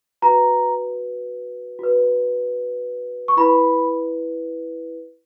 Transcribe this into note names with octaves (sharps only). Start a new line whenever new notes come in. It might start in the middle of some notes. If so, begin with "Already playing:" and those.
F#4 B4 A#5
F#4 B4
C#6
E4 B4 B5